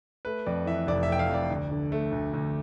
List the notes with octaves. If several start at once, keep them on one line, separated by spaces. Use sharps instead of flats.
A3 B4
F2 D5
E3 E5
F1 D5
E5
A3 G5
F5
F2 D5
D2
D3
A3
D2
D2